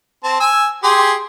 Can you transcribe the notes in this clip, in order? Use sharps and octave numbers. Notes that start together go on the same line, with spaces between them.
C4 A5
G#5 E6
G4 G#4 C6